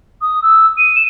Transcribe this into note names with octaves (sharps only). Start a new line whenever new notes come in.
D#6
E6
D#7
E7